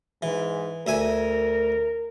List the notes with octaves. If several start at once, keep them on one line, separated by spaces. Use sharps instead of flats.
G#2 E3
D2 A#4 E5 G#5